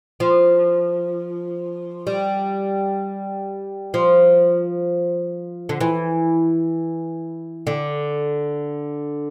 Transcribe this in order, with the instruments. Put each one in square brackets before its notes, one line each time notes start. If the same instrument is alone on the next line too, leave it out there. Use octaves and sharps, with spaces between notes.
[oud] F3
G3
F3
D3
E3
D3